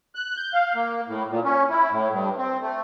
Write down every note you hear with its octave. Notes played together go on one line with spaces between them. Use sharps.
F#6
G6
F5
A#3
A2
A#2
C#4
E4
A2
G2
C4
A3